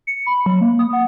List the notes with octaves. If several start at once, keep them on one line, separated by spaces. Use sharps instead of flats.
C#7
B5
F#3
A#3
D#6
F#5